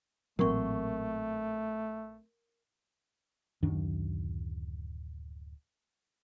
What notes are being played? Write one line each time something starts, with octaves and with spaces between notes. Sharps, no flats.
A1 A#2 F#3 A3 C4 A#4 F#5 C#6
D1 F#2 D#3 D4